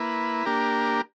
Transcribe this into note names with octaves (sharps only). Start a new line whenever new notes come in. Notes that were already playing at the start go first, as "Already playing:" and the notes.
Already playing: A#3 E4 B4
A#3 D4 G4 A#4